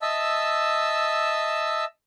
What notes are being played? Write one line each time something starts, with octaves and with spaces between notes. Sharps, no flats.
D#5 E5 A5 E6